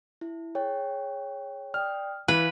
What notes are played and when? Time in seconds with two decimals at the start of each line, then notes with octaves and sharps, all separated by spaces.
0.21 E4
0.55 G#4 C#5 G5
1.74 D5 G5 D#6 F6
2.28 E3 B4 F5